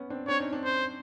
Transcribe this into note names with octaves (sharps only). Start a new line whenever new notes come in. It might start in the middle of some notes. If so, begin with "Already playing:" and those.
Already playing: B3 C#4
C4 D4
C4 D4 C#5
C#4 D#4
C4 D4
C5